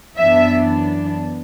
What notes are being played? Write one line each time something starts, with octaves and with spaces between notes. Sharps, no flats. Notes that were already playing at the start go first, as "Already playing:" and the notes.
F#2 E3 B3 D4 E5